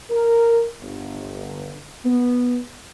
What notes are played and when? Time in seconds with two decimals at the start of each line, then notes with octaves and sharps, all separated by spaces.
0.10 A#4
0.81 G1
2.05 B3